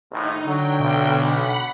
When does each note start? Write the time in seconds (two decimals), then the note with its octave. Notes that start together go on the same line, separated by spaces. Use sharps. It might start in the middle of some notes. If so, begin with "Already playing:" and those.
0.12 A#1 D#2 A2 D#4
0.47 D3 F#3 G5
0.80 B1 B2
1.14 F#5 B5